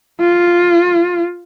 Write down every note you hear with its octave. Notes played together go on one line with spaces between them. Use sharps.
F4